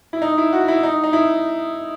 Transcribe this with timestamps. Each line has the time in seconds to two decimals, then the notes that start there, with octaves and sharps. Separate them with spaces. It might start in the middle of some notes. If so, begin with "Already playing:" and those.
0.13 E4
0.22 D#4
0.38 E4
0.53 F#4
0.68 E4
0.83 D#4
1.04 D#4
1.13 E4